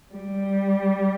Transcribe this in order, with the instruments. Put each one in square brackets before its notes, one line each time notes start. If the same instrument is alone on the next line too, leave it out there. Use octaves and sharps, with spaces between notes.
[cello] G3